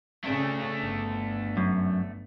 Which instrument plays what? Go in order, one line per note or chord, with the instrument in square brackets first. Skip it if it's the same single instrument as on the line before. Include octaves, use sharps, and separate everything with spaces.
[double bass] C#3 C#4 [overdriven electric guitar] A3 D4
[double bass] G1
[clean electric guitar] F#2